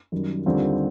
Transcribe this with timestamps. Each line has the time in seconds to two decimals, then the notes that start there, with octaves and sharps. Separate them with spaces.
0.12 F#2 D#3 G3
0.46 D#2 D3 G3 C4 F4